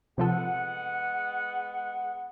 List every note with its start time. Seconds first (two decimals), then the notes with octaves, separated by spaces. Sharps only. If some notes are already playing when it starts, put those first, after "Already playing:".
0.18 C3 F3 G#3 B3 A4 F#5